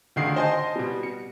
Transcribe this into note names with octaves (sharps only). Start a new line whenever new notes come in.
D2 D3 D#3 F4 G#4 C7
C5 D#5 G#5 A5 C6
B2 G3
C#7